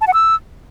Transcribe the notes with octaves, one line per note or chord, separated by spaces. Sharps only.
A5
F#5
E6